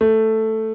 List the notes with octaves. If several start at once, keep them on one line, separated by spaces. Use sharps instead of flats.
A3